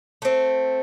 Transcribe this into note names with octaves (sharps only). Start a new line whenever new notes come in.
A3 C4